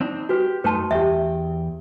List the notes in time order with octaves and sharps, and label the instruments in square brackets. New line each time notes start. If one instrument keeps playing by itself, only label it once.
[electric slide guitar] C4 D4 D#4
[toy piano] F#4 B4 [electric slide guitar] G4
[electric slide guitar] F#2 A3 D#4 [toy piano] B4 A5 C6
[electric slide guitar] E2 G5 [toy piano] G4 E5